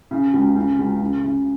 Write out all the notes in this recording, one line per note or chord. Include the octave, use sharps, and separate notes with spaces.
C#3
C#2
C#3
C#2
C#3
C#3